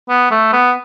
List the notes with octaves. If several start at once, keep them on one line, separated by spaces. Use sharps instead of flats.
B3
A3
B3